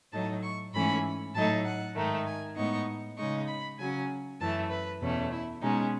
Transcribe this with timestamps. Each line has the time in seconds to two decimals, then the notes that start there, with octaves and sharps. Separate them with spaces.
0.12 A2 F#3 A3 D#4 A5
0.42 C#6
0.73 G#2 E3 A3 C#4 B5
1.34 A2 F#3 A3 D#4 A5
1.64 F#5
1.95 G#2 D#3 A3 D#4
2.26 G#5
2.56 A2 G#3 B3 D#4 C#6
3.17 C#3 G#3 D#4 C#6
3.47 B5
3.79 C#3 F#3 C#4 G#5
4.39 F#2 E3 A3 A5
4.70 B4
5.01 E2 B2 A3 C#4
5.32 E4
5.62 B2 G#3 C#4 D#4